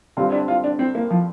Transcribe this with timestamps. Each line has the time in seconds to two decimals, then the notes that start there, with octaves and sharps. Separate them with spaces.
0.17 G2 D3 G3 C4 F4
0.32 D4
0.48 F4
0.64 D4
0.79 C4
0.95 A#3
1.10 F3